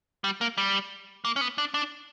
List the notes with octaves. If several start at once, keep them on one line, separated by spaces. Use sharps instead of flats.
G3
A#3
G3
A#3
C#4
B3
D4
D4